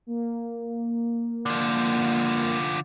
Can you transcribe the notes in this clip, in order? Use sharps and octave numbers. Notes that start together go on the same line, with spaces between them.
A#3
D3 F3